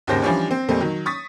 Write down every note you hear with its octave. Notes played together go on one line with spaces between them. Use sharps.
G#1 D#2 C#3 G4 C5 A#6
E3 F3 G3 C#4 D4
C4
F2 A#2 G3 A3 C4
D#3 F#3
C#6 D#6 A6 B6